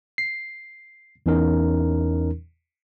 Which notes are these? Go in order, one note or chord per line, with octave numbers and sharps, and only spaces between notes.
C7
E2 E3 C#4 D#4 A#4